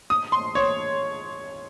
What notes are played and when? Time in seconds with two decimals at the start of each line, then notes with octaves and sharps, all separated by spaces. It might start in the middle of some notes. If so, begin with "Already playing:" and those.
0.10 D#6
0.32 C6
0.55 C#5